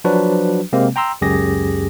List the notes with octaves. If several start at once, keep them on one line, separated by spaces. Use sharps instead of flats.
F3 F#3 D4 F#4 B4
C3 G#3 A#3 C4
G5 A#5 C6 E6
C#2 F#2 G4 G#4 A#6